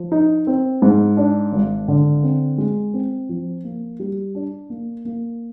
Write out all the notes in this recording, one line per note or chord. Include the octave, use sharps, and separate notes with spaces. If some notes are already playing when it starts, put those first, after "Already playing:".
Already playing: F3
D#4
C4
G#2
D4
G#1
D3
C4
G#3
C4
F3
A#3
G3
D4
A#3
A#3